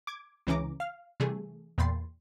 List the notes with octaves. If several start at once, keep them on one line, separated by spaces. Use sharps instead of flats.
D6 G#6
C#2 C#3 E3 C#4 A#5 D6
F5 F6
C3 E3 G3 A3 G#4
E2 A#2 G5 B5 C6 A6